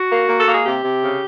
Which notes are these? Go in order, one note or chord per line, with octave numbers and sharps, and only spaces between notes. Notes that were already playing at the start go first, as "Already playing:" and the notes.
Already playing: F#4
A#3
A#3
A4
A#3 G#4
C3 G4
C3
C#3